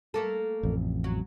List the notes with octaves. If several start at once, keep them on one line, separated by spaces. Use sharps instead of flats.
A3 A#3 A4
A1 F2
F#3